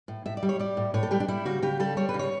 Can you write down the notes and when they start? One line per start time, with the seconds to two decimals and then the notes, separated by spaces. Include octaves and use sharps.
0.08 A2
0.26 A2 E5
0.37 D5
0.43 G3
0.49 C#5
0.59 G3 D5
0.77 A2
0.94 A2 C#5
1.03 A4
1.11 G3 G4
1.20 D4
1.28 G3 E4
1.45 C#3 F#4
1.62 C#3 G4
1.80 G3 A4
1.97 G3 C#5
2.09 B4
2.14 C#3
2.19 C#5